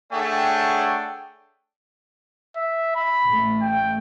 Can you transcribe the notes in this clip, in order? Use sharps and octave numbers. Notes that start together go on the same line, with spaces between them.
A3 D4 G#4 C#5 F#5 G5
E5
B5
A1 A3
G5